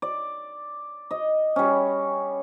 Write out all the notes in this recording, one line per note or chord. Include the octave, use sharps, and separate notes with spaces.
D5
D#5
G3 C#4